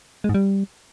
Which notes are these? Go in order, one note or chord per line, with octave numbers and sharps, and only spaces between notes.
G#3
G#2
G3